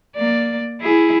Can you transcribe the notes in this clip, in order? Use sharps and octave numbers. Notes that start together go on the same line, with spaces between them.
A#3 D5
E4 G#4